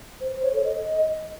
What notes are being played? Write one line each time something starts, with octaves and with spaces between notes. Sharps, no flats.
C5
C5
C#5
A4
D#5